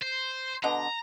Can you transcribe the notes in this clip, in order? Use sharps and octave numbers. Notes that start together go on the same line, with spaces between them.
C5
B2 D3 D#5 A#5